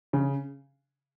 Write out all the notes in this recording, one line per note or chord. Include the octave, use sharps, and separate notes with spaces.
C#3